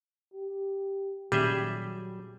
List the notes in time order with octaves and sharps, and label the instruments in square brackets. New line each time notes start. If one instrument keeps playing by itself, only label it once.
[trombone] G4
[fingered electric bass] A#2 D#3 C#4 [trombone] F#3 [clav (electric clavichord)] G3 G#4 E5 [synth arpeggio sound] G4